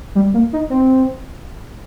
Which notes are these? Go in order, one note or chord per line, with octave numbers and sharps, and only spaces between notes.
G3
A#3
D#4
C4